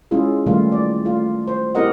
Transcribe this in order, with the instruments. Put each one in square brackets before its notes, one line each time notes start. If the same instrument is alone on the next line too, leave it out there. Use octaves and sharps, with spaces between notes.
[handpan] G#3 C#4 E4 F4 G#4
A#2 D#3 E3 G3 A3 F4
D5
A3 F4
C5
C4 E4 G4 A#4 D#5 F#5